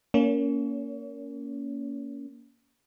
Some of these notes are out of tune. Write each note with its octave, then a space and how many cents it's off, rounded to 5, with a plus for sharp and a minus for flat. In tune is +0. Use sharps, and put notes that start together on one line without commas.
A#3 +0 C#4 +20 C#5 +40